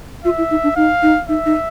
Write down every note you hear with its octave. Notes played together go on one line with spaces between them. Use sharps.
F4 E5
E4
D#4
D4
D#4 F5
D#4
D#4 E5
D#4